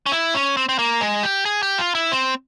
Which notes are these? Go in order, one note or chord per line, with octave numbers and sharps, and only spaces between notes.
C#4
E4
C#4
C4
C4
A#3
G#3
G4
G#4
G4
F4
E4
C4